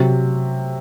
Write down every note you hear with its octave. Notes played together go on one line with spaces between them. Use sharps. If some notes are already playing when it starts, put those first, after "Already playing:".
Already playing: C3 F#3